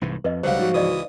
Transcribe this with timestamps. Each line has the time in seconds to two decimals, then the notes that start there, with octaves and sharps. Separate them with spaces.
0.01 C2 G#2 E3
0.24 F2 B4 D#5
0.43 C#2 D3 F#3 G3 C5 F5 F#5
0.59 G#2 F3 D#4 F#4
0.74 C#2 E3 B4 D5 D#5 D#6